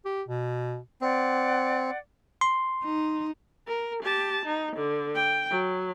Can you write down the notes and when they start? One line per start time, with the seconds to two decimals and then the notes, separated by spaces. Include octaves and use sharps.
0.05 G4
0.29 B2
1.01 C4 D5 F#5
2.41 C6
2.84 D#4
3.68 A#4
4.03 G4 A5
4.46 D#4
4.77 D3
5.15 G5
5.50 F#3